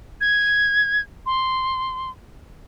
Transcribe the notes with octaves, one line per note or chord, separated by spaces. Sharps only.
G#6
C6